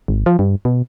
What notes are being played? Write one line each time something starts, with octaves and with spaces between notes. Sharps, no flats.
G#1
F3
G2
B2